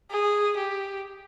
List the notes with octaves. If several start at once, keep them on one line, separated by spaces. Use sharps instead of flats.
G#4
G4